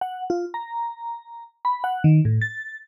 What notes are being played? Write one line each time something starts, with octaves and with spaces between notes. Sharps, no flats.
F#5
F4
A#5
B5
F#5
D#3
A2
A6